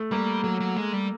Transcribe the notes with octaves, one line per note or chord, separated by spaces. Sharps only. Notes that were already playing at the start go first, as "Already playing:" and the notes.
Already playing: A3
G3 A#3
F#3 A3
F#3
G#3
G3